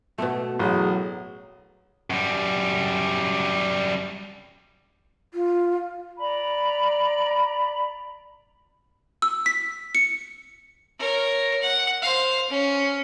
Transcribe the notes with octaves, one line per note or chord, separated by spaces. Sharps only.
B2 A3 B3
A1 F#3 G#4
F#2 G3
F4
D5 A#5 B5
E6
B6
C#7
A#4 C#5
F#5
C5 F5
C#4